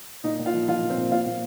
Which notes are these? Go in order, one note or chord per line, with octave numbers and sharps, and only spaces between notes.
A#2 D#4 D#5
A#2
F4 F5
F3
F3 F4 F5
A#2
C4 C5
A#2
A#2 F4 F5
A#2